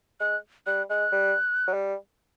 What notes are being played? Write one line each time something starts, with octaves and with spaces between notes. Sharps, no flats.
G#3 F#6
G3 F#6
G#3 F#6
G3
F#3
G3